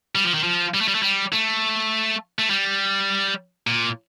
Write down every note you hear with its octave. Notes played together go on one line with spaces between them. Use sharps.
G3
F3
D#3
F3
G3
A3
G3
A3
G3
A3
A3
G3
A#2